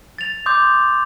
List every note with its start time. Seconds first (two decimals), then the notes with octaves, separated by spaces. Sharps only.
0.18 A6 F7
0.46 C6 D6 D#6 G6